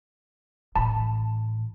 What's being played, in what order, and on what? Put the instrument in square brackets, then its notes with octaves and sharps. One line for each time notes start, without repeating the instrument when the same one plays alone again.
[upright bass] A1 [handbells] A5 B5